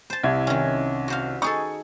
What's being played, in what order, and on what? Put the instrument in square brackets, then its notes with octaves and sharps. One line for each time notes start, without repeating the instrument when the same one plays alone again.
[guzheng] C5 A5
[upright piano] C2 E4 G#6
[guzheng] D#3 C#4
F#4 C5 F5
[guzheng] D#4 G#4 A4 [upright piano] C#6